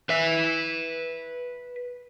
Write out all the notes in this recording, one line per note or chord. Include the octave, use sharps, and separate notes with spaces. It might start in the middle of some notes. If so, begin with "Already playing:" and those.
B4 E5